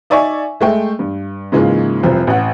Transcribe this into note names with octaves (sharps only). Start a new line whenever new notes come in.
D#4 D5 E5 G#5 C#6
G#3 A3 G5
G2
G#2 C#3 E3 G#3 A#3 F4
F1 C2 F3 C4
A1 F#5